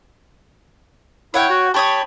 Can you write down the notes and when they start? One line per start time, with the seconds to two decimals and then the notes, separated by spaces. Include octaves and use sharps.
1.34 E4 C#5 F#5 G5
1.50 F#4
1.74 G4 C#5 G5 A5 B5 D#6